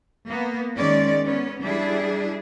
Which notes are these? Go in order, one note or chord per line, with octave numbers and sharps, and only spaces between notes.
A#3 B3
D#3 G#3 C#4 D5
B3 C#4
G3 D4 E4 G#4